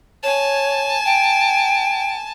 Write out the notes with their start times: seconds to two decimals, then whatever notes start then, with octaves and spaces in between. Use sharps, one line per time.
0.23 C#5 G#5 A5
1.05 G5